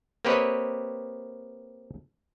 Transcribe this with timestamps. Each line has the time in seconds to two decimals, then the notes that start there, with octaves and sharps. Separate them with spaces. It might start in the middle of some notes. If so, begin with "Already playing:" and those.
0.25 A#3 C4 G4 B4 C#5 D#5